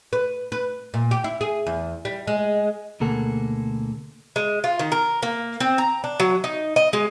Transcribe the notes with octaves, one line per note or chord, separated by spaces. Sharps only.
B4
B4
A#2
G4
E4
G#4
E2
G3
G#3
D2 B2 A#3 G#4 A4 F#5
G#3
F4
D#3
A#4
A#3
C4
A#5
D4
F#3
D#4
D#5
G#3